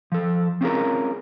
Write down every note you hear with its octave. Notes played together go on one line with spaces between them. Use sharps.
F3 A4
C4 C#4 F4 F#4 G#4 A#4